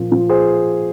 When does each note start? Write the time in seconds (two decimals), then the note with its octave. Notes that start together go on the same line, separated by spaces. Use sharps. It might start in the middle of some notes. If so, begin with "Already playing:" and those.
Already playing: A#2 F3
0.11 F3
0.29 G#4 C5